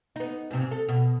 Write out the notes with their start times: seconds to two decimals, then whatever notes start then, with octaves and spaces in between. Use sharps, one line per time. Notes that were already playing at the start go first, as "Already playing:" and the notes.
0.16 B3 D#4
0.51 G#2 C3
0.71 A4
0.88 B2